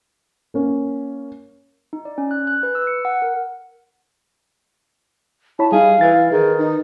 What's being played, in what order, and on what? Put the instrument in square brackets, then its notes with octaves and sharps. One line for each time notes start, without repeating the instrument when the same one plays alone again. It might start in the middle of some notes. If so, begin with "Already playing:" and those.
[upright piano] A#3 C#4
[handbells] D#4
D5
C#4
F#6
F#6
B4
E6
C#7
F#5
A#4
[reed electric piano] E4 C#5 B5 [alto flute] A5
[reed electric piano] G3 D#4 [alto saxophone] G#4 [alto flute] F5
[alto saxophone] E3 [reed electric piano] B4 A6
[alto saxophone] D#3 [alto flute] G#4
[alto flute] D#4